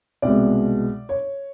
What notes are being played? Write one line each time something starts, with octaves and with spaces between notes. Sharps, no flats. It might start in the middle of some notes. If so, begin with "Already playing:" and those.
C2 B2 G#3 D5
C#5